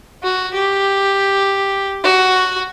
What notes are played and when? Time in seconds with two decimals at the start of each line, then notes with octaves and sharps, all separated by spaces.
0.23 F#4
0.54 G4
2.04 F#4